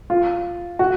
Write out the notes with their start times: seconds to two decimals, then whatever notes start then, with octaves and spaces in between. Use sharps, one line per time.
0.10 F4
0.79 F#4